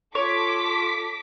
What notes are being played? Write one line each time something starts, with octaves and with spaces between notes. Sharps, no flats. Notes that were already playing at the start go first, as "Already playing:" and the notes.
F4 A4 C#5 D6 B6